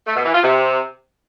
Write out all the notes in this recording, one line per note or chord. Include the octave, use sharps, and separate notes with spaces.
A3
B2
E3
F4
C3